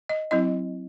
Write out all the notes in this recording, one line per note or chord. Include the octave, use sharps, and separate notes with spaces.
D#5
F#3 C4 E4 D#5